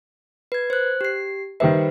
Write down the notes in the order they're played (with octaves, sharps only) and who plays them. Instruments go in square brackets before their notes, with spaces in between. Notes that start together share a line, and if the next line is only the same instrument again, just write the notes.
[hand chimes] B4 G#6
C5 F#6
G4 C7
[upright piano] D#3 G3 E5 [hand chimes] B4 C5